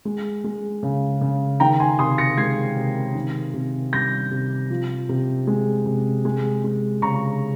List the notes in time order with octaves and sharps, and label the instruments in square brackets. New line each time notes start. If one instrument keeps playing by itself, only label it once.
[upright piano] G#3
G#3
C#3
C#3
D#3 G5 A#5
G#5 C6
C3 C6 D#6
A#6 C#7
G#3 G#6 C7
C3
D#3
C3
G3 G6 A#6
C3
F3
C3
G#3
C3
G#3
G#3
C#3 A#5 C#6